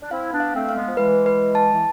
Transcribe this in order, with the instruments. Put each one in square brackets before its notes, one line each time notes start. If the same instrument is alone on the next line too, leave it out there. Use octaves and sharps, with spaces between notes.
[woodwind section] D4
[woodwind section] C4 E4 [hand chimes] F5
[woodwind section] B3 D4
[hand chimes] F5
[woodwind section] A3 C4
[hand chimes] F5
[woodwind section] G#3 B3
F3
[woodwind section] E3 G#3 [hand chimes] B4
[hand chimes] B4
A5
[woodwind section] E3